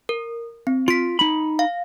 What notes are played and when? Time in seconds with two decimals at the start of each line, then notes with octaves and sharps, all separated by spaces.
0.09 A#4
0.67 C4
0.88 F4 B6 D7
1.19 D#4 B5
1.59 F5